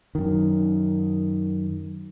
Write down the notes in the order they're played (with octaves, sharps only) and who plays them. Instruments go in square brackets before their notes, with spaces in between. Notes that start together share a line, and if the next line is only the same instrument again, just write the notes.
[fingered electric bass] F#2 D#3